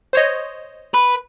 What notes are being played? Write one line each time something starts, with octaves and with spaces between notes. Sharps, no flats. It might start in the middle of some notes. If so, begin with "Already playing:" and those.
C5 C#5 D#5
B4